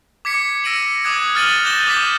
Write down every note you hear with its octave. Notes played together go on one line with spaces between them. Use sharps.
D6 G#6 B6 C#7
E6 A#6 D7 D#7 F#7
D6 D#6 F#6 G#6
F6 A6 D#7 F#7
D6 F#6 G6 A#6 E7 G7
D6 G6 B6 D#7